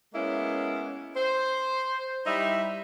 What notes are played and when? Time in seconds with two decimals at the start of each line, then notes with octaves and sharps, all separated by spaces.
0.14 G#3 A#3 B3 C#4 E4
1.17 C5
2.26 G3 D#4 E4 E5